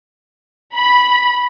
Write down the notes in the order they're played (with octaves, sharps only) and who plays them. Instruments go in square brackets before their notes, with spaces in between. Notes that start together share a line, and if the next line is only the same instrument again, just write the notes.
[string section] B5